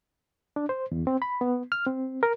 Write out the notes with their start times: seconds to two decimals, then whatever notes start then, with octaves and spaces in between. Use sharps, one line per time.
0.56 D4
0.69 C5
0.91 E2
1.07 C4
1.22 B5
1.41 B3
1.72 F6
1.86 C4
2.23 A#4